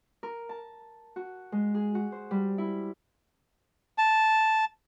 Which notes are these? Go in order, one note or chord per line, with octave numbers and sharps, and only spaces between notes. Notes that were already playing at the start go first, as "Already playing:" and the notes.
A#4
A5
F#4
G#3
G#4
F#4
C5
G3
E4
A5